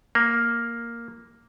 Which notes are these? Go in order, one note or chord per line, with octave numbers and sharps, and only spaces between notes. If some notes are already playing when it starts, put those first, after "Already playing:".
A#3